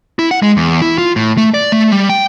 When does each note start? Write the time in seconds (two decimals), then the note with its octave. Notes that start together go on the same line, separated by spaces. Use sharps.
0.19 E4
0.31 F#5
0.42 G#3
0.57 E2
0.82 E4
0.98 F4
1.16 A2
1.37 A3
1.54 D5
1.72 A3
1.91 G3
2.09 G5